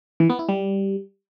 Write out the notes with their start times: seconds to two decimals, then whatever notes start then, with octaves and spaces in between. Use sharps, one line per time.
0.20 E3
0.30 B3
0.39 E4
0.49 G3